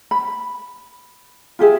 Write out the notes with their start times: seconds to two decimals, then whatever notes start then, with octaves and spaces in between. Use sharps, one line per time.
0.11 B5
1.59 F4 G4 G#4 E5